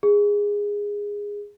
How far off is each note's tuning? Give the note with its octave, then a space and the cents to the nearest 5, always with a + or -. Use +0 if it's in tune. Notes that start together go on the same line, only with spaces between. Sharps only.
G#4 -15